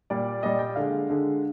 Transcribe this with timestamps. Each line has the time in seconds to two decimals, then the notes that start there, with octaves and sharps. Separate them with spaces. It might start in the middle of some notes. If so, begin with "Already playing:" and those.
0.10 A#2 G3 D5
0.43 A#2 G3 D#5
0.59 G5
0.75 D3 G#3 F5
1.10 D3 G#3